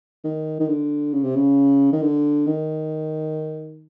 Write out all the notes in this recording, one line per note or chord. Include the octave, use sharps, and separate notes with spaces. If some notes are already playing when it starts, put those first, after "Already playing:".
D#3
D#3
D3
C#3
C3
C#3
D#3
D3
D#3